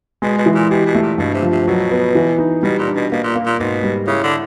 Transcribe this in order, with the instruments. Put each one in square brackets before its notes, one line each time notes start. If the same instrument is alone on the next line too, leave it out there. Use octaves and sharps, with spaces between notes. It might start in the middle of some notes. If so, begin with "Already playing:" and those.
[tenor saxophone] B2 [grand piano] G#3
[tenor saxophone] B2
[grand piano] E3
[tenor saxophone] A#2
[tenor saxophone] B2 [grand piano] G4
[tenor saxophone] B2
[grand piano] A3
[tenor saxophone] A#2
[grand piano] G2 [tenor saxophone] B2
[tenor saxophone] C3
[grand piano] F3
[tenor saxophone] C3
[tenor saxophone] B2 [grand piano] F#3
[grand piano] B3
E3
D#4
[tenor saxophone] B2 [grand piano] G3
[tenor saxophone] A#2
[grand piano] D4
[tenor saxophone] B2
[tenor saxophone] B2 [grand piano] A#3
[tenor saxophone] A#2
[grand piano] A#3
[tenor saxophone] A#2
[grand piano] G#2 [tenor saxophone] B2
[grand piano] G3
[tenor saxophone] C#3 [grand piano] E4
[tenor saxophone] D3